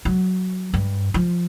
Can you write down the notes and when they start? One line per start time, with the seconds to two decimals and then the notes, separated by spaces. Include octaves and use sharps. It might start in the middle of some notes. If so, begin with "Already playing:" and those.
0.05 F#3
0.74 G2
1.14 F3